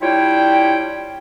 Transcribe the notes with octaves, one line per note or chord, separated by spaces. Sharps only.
G3 D4 E4 F4 C#5 G5